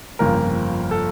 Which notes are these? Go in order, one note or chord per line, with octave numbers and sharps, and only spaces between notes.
G1 F2 C#3 F3 A#3 A#4
A4